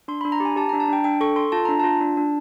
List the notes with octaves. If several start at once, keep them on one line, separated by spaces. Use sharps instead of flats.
D4 C6
D4 B5
A#5
G4
G#5
G4 A5
D4 A#5
A5
D4 G5
D4 G5
A4 C#6
A4 C6
F4 A5
D4 A#5
F4 A5
D4
D4